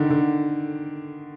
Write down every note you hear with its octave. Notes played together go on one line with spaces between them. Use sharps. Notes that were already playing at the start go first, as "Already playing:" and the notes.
Already playing: D3 D#3
D3